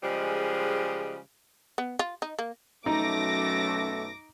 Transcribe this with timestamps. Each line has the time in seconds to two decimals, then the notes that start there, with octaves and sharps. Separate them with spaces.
0.04 C#3 F3 G3 G#3
1.78 B3
1.99 F4
2.22 D#4
2.39 A#3
2.86 B1 F#2 A3 D#4 D6 A#6